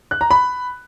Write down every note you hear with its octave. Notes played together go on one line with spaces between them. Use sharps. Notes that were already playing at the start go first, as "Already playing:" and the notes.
F#6
A#5
B5